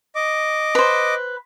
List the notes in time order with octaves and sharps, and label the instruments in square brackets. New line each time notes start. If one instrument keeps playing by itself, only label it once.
[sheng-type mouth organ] D#5 D6
[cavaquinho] B4 C5